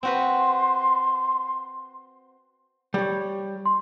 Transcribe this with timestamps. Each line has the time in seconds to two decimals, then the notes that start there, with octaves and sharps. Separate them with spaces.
0.03 C4 F#4 B4 C6
2.94 G3 C#5
3.65 C6